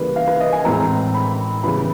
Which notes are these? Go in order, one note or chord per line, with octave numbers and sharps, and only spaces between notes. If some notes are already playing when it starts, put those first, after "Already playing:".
Already playing: C#3 E3 G3 A#3 B4
F5
B4
D#5
G#5
A2 E3 G#3 C4 A#5
B5
C#3 E3 G3 B3 B5